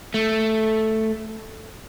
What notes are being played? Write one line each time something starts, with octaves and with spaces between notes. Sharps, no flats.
A3